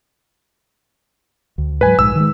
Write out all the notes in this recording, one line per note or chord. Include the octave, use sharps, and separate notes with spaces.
D2
G#2 F#3 B4 G#5
A#1 G#2 E6
D#3 G#3